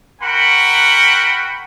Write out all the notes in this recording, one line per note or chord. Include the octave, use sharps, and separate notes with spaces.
F#4 A#4 F#5 G5 B5